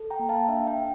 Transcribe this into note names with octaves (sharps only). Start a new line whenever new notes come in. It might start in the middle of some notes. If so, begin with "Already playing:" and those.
Already playing: A4
G5 A#5
A#3
F5 A5
D4 E5 G5
E5 G5
D4